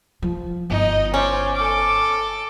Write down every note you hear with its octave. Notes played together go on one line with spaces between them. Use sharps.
F3
G1 D#4 D#5
C#4 C5 D5
A4 D6